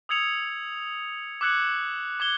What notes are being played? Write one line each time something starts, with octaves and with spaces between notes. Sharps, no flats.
D#6 E6 G#6 C#7 F7
D6 E6 F#6 G#6 C#7 F#7
D6 G#6 G7